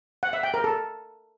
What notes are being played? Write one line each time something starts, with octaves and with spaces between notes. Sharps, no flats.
F#5
E5
G5
A#4
A4